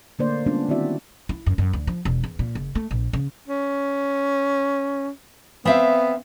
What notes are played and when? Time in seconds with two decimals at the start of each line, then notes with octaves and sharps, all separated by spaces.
0.19 D3 A3 A#3 D4 C5 D5
0.46 G3 G#3 B3 C#4 D4 F4
0.69 D#3 C4 E4 F#4 D5 E5
1.29 E4
1.46 F#2
1.58 F#2
1.73 D2
1.87 F3
2.05 E1
2.24 E2
2.39 A#2
2.55 F#1
2.75 A3
2.91 A#1
3.13 C#3
3.48 C#4
5.65 B3 C4 E5 F5